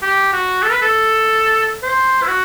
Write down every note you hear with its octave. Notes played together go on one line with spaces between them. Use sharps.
G4
F#4
A4
B4
A4
C5
E4
F#4